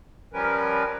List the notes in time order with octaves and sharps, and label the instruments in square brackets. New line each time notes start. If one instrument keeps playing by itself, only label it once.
[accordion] F3 G3 C#4 A#4 B4